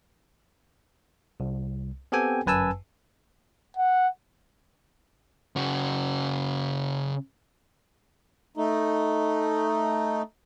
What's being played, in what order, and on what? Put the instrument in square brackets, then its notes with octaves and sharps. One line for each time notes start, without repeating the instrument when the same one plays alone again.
[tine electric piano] C2
B3 C4 G4 A4 G5 G#5
G1 F#2 B4 G#5 A5 E6
[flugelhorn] F#5
[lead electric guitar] C#3 F#4
[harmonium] A3 D#4